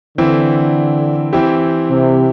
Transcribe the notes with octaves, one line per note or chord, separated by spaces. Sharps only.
D3 E3 C4 E4
E3 C4 E4 G4
C3